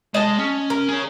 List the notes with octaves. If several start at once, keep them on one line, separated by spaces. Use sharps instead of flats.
G#3 D#5 G#5 A5
C#4
A#4
G#4 C#5